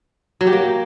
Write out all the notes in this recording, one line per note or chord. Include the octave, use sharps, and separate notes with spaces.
F#3
G4
A#3